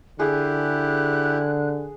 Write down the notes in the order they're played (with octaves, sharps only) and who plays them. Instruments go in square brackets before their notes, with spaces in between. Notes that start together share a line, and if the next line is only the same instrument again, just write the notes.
[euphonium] D3 [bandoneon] E4 G4 [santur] G#4 [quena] F#6